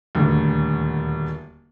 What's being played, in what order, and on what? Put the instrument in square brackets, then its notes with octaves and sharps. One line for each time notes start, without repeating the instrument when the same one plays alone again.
[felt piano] D#1 D2